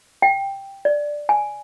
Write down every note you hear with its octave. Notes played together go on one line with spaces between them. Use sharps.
G5
D5
G#5